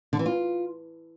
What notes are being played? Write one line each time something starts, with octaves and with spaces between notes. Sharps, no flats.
D3
E3
F4